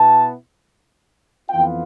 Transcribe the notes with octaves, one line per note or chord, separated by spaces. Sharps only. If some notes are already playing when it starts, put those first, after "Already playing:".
Already playing: B2 B3 E4 A5
F2 E3 B3 F4 G5